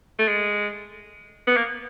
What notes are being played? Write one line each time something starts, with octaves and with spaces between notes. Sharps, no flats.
A3
G#3
B3
A#3